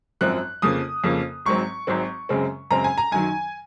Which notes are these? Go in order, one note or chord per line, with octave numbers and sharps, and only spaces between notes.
G#1 F#2 F3 C4 F#6
F2 C#3 F3 A#3 D#6
F2 C#3 F3 A#3
G#1 G#2 F#3 C4 C#6
G#1 G#2 F#3 C4
F#2 C#3 G#3 C4
F#2 C#3 G#3 C4 A#5
G#5
A#5
F#2 D#3 F#3 G#5